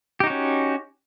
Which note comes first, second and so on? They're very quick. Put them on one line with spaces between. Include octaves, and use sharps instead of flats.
G4 D#4 F#4 C#4